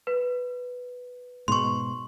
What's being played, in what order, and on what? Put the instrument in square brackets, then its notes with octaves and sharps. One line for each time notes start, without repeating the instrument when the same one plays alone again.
[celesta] B4
[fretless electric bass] G#2 B2 [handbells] C6 C#6